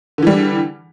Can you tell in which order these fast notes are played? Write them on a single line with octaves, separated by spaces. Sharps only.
D3 E3 G3